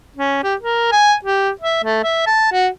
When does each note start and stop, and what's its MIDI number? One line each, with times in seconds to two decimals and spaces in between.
0.16 0.43 61
0.43 0.55 67
0.61 0.88 70
0.92 1.15 80
1.25 1.50 67
1.61 1.80 76
1.84 2.03 57
2.04 2.22 76
2.26 2.50 81
2.52 2.68 66